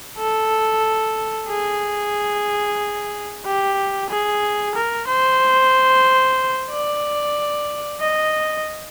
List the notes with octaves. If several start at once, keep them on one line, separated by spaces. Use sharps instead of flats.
A4
G#4
G4
G#4
A#4
C5
D5
D#5